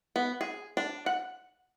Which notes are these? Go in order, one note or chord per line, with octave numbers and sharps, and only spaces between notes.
B3
G#4
D4
F#5